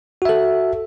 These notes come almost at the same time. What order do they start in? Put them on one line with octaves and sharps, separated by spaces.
F#4 E5 A4